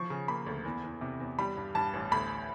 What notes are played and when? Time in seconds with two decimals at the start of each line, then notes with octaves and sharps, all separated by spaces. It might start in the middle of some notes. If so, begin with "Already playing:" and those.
Already playing: F3 C#6
0.10 C#3
0.28 A#3 B5
0.47 D2
0.65 E2
0.83 E2
1.01 C3
1.20 E2
1.39 G3 B5
1.57 G2
1.75 G2 A5
1.93 A1
2.11 D2 B5